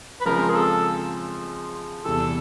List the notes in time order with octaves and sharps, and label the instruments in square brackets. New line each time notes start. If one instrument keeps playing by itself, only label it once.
[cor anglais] B4
[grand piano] C#3 F3 G#3 C4 [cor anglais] A#4
[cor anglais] G#4
A4
[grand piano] E2 C3 E3 G3 [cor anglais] A4